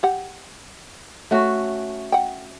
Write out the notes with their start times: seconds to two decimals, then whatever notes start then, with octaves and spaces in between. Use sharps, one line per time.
0.03 G4 F#5
1.31 A3 C#4 F#4
2.12 F#5 G5